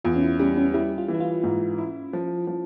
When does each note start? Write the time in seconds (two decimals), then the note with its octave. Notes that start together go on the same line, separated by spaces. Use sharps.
0.04 E2 F4
0.16 C#4
0.22 E4
0.39 G3 C#4
0.57 C#4
0.74 G3 E4
0.98 F4
1.08 E3
1.14 E4
1.20 F4
1.43 G#2
1.78 E4
2.13 F3
2.47 F3